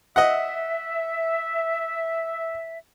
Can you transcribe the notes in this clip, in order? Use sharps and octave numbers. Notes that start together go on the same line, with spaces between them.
D#5 E5 F#5